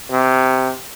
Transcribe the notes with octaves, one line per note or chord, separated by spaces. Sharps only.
C3